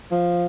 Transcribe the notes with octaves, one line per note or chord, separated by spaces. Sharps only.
F3